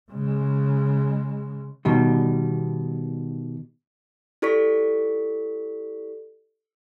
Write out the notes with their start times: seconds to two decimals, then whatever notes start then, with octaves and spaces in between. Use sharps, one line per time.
0.12 C#3 G#3
1.85 B2 D#3 G3
4.42 E4 G4 A4 D5 C#6 B6